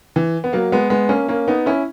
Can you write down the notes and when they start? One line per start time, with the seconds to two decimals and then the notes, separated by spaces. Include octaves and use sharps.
0.16 E3
0.44 B3
0.53 F#3 A#3
0.72 G#3 B3
0.90 G#3 B3
1.09 A#3 C#4
1.28 A#3 C#4
1.48 B3 D#4
1.66 C#4 E4